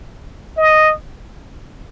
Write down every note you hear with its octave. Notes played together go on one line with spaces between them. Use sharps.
D#5